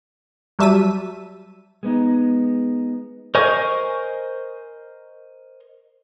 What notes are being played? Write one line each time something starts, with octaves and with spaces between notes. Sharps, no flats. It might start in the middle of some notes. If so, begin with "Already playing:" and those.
F#3 G3 E5 A5 B6 D#7
G#3 B3 D#4
A#4 C5 D#5 G#5 C#6